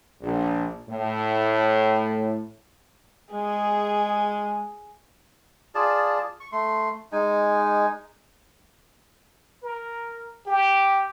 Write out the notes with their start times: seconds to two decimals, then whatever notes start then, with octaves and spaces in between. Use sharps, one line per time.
0.21 A#1
0.88 A2
3.32 G#3 G#4
5.75 F4 G#4 D5 A5
6.40 C#6
6.52 A3 C6
7.12 G#3 D#4 G#5
9.63 A#4
10.46 G4